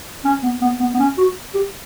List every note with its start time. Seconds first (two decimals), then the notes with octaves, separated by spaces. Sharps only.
0.25 C#4
0.43 B3
0.61 B3
0.80 B3
0.94 B3
0.99 C#4
1.18 F#4
1.55 G4